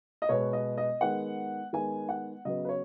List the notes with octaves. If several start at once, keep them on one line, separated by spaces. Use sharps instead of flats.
D#5
B2 G#3 B3 C#5
D#5
D#5
D#3 G#3 B3 F#5
D#3 G#3 B3 G#5
F#5
C#3 F#3 B3 D#5
B4
C#5